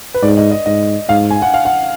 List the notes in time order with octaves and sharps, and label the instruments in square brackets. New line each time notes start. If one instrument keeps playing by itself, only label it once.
[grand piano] B4
[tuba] G#2 [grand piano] D5
[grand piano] D#5
D#5
[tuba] G#2 [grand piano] D#5
[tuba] G#2 [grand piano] F5
[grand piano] G#5
F#5
F5
F#5